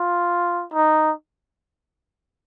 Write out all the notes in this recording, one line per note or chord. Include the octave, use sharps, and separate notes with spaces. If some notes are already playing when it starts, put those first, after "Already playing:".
Already playing: F4
D#4